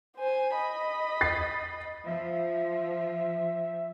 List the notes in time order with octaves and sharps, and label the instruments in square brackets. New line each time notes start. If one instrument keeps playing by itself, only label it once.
[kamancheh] C5 G#5
D#5 B5
[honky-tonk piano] A6 C7
[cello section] F3 [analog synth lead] E5